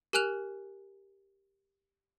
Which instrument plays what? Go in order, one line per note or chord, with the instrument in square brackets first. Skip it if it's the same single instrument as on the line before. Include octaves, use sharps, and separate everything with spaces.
[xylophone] G4 A#4 G#5 F6 F#6 F7